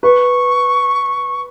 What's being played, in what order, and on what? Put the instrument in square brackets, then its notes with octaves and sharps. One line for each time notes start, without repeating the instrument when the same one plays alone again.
[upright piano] B4 [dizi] C#6